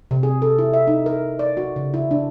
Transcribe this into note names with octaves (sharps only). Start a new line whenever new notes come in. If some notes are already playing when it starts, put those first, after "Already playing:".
C3
G#4
A4
E4
E5
D#4
A#4
D5
F#4
C#3
E4
D4